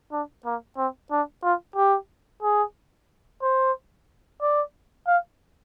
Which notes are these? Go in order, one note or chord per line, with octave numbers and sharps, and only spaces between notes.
D4
A#3
C4
D4
F4
G4
G#4
C5
D5
F5